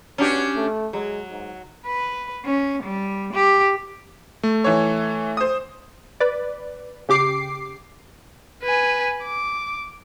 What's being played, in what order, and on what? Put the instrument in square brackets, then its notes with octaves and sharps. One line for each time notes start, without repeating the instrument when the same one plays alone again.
[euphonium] B2 [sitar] C#4 D4 G4
[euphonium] A3
[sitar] F#3 [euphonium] G#3
[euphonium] G#2
[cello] B4
C#4
G3
G4
[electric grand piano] A3
[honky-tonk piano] E3 C#5
C5 D#6
[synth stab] B4 D5
C#3 G4 D6 C7
[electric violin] B4 G#5
D6